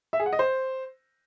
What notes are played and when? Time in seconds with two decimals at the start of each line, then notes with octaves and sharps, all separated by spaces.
0.13 E5
0.20 G#4
0.26 F#5
0.33 D#5
0.39 C5